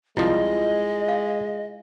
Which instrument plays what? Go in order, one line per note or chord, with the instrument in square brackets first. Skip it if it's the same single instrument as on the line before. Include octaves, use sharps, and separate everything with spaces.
[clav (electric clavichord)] C2 F3 [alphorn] G#3 [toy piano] E4 F4 [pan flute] D#5
[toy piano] F5